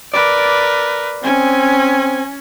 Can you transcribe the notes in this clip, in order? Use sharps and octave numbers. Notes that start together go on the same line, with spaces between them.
A#4 B4 D5
C4 C#4 G#5